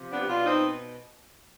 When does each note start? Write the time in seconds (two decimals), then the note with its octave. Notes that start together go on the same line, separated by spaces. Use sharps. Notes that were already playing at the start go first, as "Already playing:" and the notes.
Already playing: C3 F3
0.11 B3 D4
0.21 G4
0.28 B2 D4 F4
0.46 C4 D#4